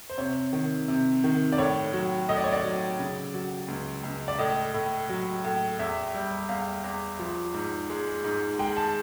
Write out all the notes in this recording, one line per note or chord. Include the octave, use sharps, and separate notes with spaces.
C5
C3 C#5
D#3
C3
D#3
D5
A2 C#5
F#3
A2 D#5
D5
C#5
D5
F#3
C#3
F#3
C#2
C#2
D5
A2 D#5
A2
F#3
A2
E2 E5
G3
E2 F5
E2
F3
G#2
G#3
G#2
G#3 G5
A5